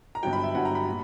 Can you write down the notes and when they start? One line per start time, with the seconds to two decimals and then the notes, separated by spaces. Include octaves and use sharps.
0.15 A#5
0.23 G1 G2 F#3 G5
0.33 B5
0.44 E5
0.54 G1 G2 F#3 F#5
0.65 A#5
0.75 B5
0.88 A#2